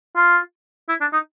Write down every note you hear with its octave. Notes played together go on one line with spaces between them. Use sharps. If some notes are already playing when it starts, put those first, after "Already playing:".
F4
E4
D4
D#4